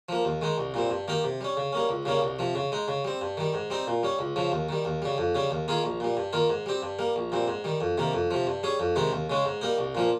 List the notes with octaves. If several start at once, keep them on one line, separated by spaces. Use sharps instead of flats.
F3 A#3
D#2
D#3 G#3 D#4
C2
A#2 G3 C4
G2
D#3 A#3 D#4 G4
C3
G3 C#4
C#3
G3 A#3 C#4
C#2
C#3 G3 A#3 C#4
C2
C3 F3
C#3
G#3 D#4
C#3
G3 C4
G2
D#3 G3
G#2
G3 C4 D#4
A#2
G3 C#4
C#2
C#3 F3
D#2
D#3 G3
D#2
C#3 G3
F2
C#3 G3 C#4
D#2
D#3 A#3 F4 G#4
A#1
A#2 G3
G2
D#3 A#3 F4
G#2
G3 C4 G4
G2
G3 A#3
A#1
A#2 G3 C4
G#2
D#3 G3
F2
C3 D#3 A#3
F2
C3 F3
G2
G3 C#4 G#4
F2
C3 D#3 G#3 D#4
D#2
C#3 G#3 C#4
G#2
G3 A#3 D#4
C2
A#2 F3 A#3